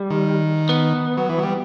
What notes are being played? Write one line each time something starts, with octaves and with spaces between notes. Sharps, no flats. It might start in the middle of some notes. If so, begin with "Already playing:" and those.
Already playing: G3
D#3
B3
F#3
E3
F#3
G3